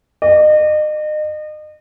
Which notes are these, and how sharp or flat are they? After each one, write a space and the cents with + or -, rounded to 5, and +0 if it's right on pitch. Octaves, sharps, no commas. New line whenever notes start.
D#5 -35